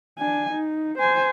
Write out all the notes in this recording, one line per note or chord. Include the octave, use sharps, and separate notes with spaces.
D4 G#5
D#4
C5 G#5